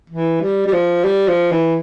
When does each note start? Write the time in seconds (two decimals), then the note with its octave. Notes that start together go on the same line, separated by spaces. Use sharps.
0.10 E3
0.41 G3
0.66 G3
0.73 F3
1.04 G3
1.28 F3
1.52 E3